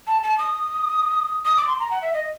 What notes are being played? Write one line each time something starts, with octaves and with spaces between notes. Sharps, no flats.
A5
A5
D#6
D#6
D6
C6
A#5
F#5
E5
D#5